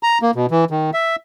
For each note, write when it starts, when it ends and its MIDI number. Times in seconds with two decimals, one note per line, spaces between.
0.03 0.18 82
0.22 0.31 58
0.35 0.46 47
0.51 0.65 52
0.71 0.90 51
0.94 1.16 76